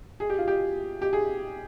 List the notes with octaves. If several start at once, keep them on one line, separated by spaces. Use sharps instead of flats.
G#4
G4
F4
G4
G4
G#4